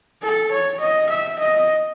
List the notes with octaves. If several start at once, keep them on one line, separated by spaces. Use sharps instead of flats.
A4
C#5
D#5
E5
D#5